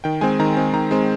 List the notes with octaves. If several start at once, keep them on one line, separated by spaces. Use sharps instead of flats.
D#3 G5
G#3 C4 G#5
D#3 A#5
G#3 C4
D#3 A#5
G#3 C4